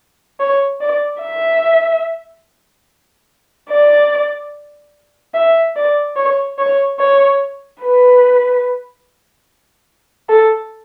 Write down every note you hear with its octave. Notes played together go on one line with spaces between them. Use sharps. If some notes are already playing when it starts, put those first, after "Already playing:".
C#5
D5
E5
D5
E5
D5
C#5
C#5
C#5
B4
A4